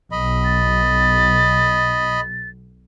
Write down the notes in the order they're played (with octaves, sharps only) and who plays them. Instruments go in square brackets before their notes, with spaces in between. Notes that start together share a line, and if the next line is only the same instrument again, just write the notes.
[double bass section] B1 [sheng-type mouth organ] D#5 B5
[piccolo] A6